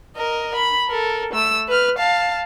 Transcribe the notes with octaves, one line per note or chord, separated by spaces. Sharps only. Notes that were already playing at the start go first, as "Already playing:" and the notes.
A#4 D#5
B5
A4 A#4
A3 E6
B4 F6
F5 A5